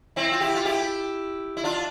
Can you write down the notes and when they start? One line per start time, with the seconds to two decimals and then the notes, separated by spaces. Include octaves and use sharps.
0.16 C4 E4
0.32 F4
0.41 E4 G4
0.54 F4
0.65 E4 G4
1.57 E4
1.64 D4 F4